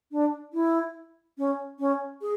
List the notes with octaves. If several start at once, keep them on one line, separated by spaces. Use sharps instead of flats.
D4
E4
C#4
C#4
G#4